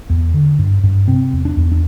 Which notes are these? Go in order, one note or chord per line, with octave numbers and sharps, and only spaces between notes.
E2
D3
G2
G2
C3 C4
E2
D4
E2
D4